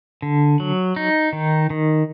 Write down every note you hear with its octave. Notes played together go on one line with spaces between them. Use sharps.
D3
F#3
D#4
D#3
D#3